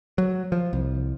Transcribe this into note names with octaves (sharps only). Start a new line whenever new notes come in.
F#3
F3
C2